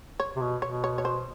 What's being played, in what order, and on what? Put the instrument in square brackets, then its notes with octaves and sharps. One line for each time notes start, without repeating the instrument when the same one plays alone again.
[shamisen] C#5
[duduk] C3
B2
[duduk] B2 [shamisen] C#5
[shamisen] C#5
C#5
C5